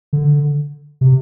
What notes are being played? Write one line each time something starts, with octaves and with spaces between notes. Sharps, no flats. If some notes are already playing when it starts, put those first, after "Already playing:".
D3
C3